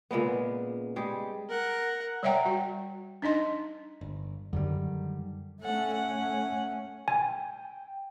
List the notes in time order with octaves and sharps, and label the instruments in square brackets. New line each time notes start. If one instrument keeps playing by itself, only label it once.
[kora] A#2 C#3 G#3 B3
G3 G#3 G4 G#4
[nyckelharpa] A#4 F#5
[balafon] G3 C#5 E5 F#5 G5 A#5
F#4
D4 D#4 D#5 C6
[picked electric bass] G1
[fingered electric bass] F#2 [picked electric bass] D3 D#3 G3
[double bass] A3 C#4 [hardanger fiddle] A4 F#5
[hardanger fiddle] F#5
[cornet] G5 [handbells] G#5